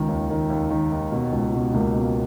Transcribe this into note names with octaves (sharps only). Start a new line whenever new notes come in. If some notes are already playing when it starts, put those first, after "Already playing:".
Already playing: C#2 D#3
D#2
D#3
D#2
D#3
D#2
B2
C#2
B2
C#2 A#3
B2